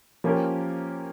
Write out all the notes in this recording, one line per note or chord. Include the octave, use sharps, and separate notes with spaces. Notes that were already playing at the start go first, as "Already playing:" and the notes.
F3 A#3 C#4 G4 A#4